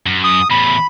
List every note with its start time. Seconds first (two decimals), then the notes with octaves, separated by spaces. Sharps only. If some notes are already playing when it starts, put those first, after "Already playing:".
0.06 F#2
0.24 D#6
0.51 E2 A2 B5